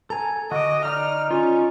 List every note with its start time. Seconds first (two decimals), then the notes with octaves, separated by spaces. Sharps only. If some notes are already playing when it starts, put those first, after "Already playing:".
0.10 A4 G#5 A#5
0.52 D3 F#4 D#5 D6
0.85 D#4 D5 F6
1.31 C#4 F4